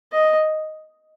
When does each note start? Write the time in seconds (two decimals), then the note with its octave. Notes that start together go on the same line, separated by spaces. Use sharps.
0.13 D#5